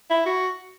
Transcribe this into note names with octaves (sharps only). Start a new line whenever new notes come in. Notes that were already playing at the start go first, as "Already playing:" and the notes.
E4
F#4